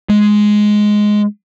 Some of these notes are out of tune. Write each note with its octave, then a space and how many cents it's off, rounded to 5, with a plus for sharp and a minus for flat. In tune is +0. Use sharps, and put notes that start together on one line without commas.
G#3 +5